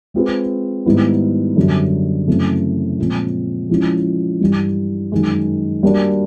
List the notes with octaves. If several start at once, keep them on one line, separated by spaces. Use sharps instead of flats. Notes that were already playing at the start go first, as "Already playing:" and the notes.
G#3 C4 F4 G#4 B4
G#2 D#3 G3 B3 E4
F#2 D3 G3
F#2 C#3 E3 A3 C4
A#2 F3 G#3 C4
F3 G#3 C#4 E4
G2 E3 G3
F#2 D#3 G#3
G3 A#3 D4 F#4